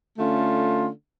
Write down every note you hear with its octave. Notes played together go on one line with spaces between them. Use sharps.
D3 A3 C#4 F4